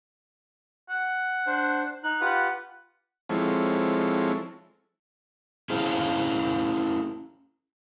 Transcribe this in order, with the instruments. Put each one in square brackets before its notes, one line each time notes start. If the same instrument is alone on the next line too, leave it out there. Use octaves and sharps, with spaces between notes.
[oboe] F#5
[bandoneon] D4 C5
D#4 F#6
[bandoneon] F4 G4 B4 [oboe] F#5
[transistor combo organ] F3 G#3 C4 E4 A4 C#5
[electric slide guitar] C#4 E4 G#4 C5 F5 A5